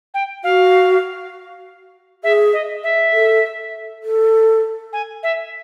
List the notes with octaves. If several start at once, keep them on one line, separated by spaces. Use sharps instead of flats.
G5
F#4 F5
G#4 E5
D#5
E5
A4
A4
G#5
E5